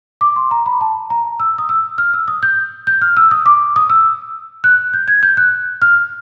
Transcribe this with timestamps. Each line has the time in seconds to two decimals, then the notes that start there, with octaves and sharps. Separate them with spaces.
0.21 D6
0.36 C6
0.51 A#5
0.66 B5
0.81 A5
1.10 A#5
1.40 E6
1.58 D#6
1.69 E6
1.98 F6
2.14 E6
2.28 D#6
2.43 G6
2.87 G6
3.02 F6
3.17 E6
3.31 D#6
3.46 D6
3.76 D#6
3.90 E6
4.64 F#6
4.94 G6
5.08 G#6
5.23 G6
5.37 F#6
5.82 F6